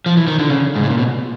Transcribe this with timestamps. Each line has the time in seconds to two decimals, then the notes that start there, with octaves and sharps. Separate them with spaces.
0.06 F3
0.17 E3
0.27 D#3
0.39 D3
0.50 C#3
0.76 G#2
0.83 A2
0.90 A#2
0.98 B2